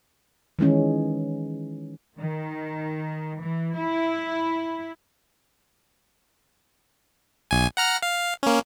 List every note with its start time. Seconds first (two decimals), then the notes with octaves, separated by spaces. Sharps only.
0.59 D#3 E3 G#3 C#4
2.19 D#3
3.42 E3
3.77 E4
7.51 B1 G#5
7.77 F#5 A#5 F6
8.03 F5
8.43 A#3 C#4